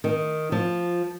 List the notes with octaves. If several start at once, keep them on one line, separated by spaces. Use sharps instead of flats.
D#3
F3